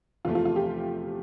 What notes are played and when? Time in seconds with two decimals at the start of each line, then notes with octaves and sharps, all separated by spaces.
0.25 E2 C3 F3 A3 F4
0.35 F4
0.45 F4
0.56 G4